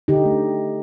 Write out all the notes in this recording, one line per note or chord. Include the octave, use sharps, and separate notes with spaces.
D3 D#4 G4
A3